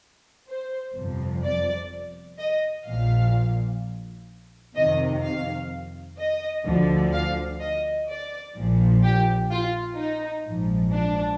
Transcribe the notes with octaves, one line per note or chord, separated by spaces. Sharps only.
C5
G1 F2 C3 F3
D5
D#5
A#1 A#2 F3 F5
F2 C3 D#3 D#5
F5
D#5
D2 D3 F3
F5
D#5
D5
A#1 A#2 F3
G4
F4
D#4
A#1 G#2 F3
D4